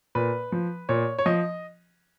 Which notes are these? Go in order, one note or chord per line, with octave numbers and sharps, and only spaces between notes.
A#2 B4
F3
A#2 C#5
C#5
F3 D#5